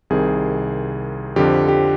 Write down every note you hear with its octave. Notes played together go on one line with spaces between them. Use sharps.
C2 C3 D#3 G#4
F2 D3 F3 G4
G4